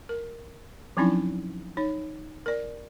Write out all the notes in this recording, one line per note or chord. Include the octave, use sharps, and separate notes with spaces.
A#4
F3 F#3 C4 C#4 D#4 E4
D#4 C#5
A#4 D5